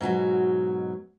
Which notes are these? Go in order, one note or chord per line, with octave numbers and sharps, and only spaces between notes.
G#2 B2 F3 F#3